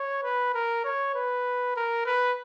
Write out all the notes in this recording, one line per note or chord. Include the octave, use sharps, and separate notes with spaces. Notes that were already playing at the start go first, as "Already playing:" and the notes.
Already playing: C#5
B4
A#4
C#5
B4
A#4
B4